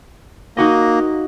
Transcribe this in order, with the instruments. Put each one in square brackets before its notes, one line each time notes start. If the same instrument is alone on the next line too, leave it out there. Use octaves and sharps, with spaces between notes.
[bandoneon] A#3 [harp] D#4 F#4 D#5